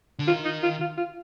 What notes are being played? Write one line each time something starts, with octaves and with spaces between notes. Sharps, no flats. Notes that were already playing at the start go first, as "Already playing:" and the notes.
D3
D#3 F4
D#4
F4
F4
F4